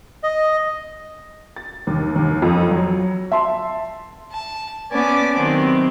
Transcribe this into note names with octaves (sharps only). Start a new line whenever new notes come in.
D#5
A6
D#2
D#2
F2
F#3
E5 A5 C6
A5
B3 C#4 D5 G#5 A5 D6
C3 D#3 F#3 B3 C4